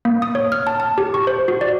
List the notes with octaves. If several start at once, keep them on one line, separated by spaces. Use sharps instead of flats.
A#3
D#6
C#5
F6
A5
A5
G4
C#6
C5
F#4
D5